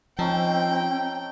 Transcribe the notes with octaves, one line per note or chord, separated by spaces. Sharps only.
F3 C4 C#4 D#4 A4 G5